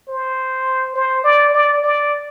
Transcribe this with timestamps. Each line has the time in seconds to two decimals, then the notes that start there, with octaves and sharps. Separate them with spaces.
0.08 C5
0.95 C5
1.24 D5
1.54 D5
1.84 D5